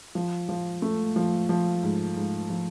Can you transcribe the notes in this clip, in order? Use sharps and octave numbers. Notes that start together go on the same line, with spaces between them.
F3
F3
A3
F3
F3
G#2
G#2
F3